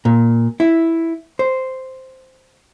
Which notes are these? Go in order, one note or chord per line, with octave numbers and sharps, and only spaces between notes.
A#2
E4
C5